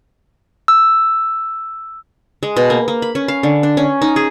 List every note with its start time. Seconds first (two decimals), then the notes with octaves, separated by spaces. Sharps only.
0.68 E6
2.43 G#3
2.56 B2
2.70 A#3
2.88 A#3
3.02 B5
3.15 C#4
3.28 F5
3.43 D3
3.63 D4
3.77 C#4
4.02 D#4
4.16 G#4